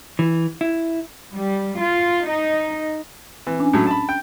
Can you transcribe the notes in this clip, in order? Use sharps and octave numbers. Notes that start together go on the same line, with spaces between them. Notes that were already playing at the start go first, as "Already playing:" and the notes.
E3
E4
G3
F4
D#4
E3 C4
C#4 D4 G#5
A2 F#3
A5 B5
G5